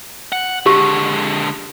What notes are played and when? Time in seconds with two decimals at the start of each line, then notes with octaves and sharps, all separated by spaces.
0.32 F#5
0.66 D3 G#3 G4